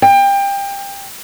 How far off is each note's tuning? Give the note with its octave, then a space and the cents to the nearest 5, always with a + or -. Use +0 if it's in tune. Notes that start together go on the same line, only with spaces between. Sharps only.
G5 +25